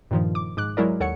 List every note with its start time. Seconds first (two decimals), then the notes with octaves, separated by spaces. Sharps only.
0.11 G2 A#2 D#3 F3
0.35 D6
0.57 G#2 D6 F#6
0.77 F#3 G#3 E4 A#4 D5
1.00 D#2 A4 C#5 F#5 C#7